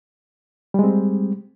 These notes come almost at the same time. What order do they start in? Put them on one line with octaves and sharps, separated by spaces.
G3 G#3 C4